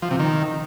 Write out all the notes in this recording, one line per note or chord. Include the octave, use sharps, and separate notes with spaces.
F3
C3
D#3